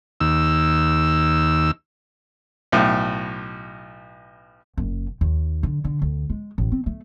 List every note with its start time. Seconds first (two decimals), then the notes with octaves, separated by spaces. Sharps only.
0.21 D#2 E6
2.72 B1 A2
4.77 F#1
5.21 D#2
5.63 D3
5.84 D3
6.02 D2
6.30 G#3
6.58 A1
6.72 C4
6.86 A3